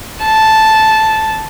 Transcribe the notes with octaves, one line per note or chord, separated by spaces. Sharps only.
A5